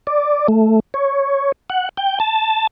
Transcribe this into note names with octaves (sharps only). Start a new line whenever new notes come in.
D5
A3
C#5
F#5
G5
A5